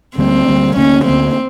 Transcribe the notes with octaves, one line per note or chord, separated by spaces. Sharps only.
D2 D3 G3 A#3 C4
D2 D3 G3 A#3
D2 D3 G3 A#3 C#4
D2 D3 G3 A#3 C4